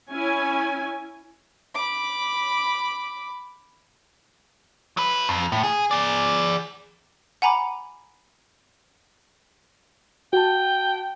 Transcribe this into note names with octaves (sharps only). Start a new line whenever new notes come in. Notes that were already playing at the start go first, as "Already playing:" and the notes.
C#4 E4 G#5
B5 D6
F#3 B4
F2
A2
G#4
G#4 D5
F#5 G#5 A#5 B5 D6
F#4 G5 A5